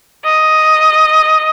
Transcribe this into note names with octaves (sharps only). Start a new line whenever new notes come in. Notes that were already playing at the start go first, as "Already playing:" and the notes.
D#5